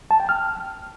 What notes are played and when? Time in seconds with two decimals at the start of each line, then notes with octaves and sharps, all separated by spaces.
0.11 A5
0.20 G5
0.29 F6